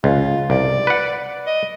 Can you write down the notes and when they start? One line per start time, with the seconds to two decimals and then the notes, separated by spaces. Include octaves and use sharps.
0.04 C#2 F4
0.50 C2 D5
0.87 B4 F#5
1.47 D#5